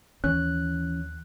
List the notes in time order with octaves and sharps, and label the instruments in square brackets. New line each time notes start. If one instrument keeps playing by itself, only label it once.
[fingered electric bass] D#2 [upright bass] E3 [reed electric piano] C#4 [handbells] F#6